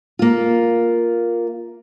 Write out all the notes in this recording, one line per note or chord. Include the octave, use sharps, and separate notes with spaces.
A#3 F4